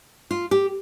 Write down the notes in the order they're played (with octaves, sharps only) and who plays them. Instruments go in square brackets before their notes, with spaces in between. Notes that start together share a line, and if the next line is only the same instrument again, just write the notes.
[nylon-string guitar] F4
G4